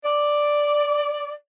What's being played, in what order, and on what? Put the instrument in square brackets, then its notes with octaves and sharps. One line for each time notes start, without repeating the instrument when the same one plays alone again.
[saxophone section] D5